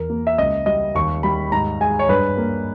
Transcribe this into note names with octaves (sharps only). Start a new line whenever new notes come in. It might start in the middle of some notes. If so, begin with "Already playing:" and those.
Already playing: E2 A#4
A#3
E5
C#2 D#5
G3 D#5
D#2 C#6
G3 B5
G#2 A#5
G#3 G#5
C#5
G2 B4
A#3